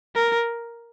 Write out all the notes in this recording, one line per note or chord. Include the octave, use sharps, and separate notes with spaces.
A#4